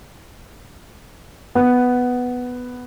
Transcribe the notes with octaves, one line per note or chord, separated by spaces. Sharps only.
B3